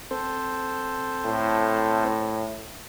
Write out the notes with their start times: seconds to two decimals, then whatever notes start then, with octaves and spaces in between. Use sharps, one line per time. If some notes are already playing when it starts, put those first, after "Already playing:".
0.11 C4 A4 C5
1.25 A2